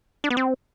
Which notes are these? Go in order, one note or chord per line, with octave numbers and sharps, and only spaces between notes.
D4
B3
C4